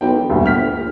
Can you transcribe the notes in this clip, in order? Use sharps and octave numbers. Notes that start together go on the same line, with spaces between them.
B1 G5
E1
D2 G2 A#2
G1 G5 F6 B6
A#1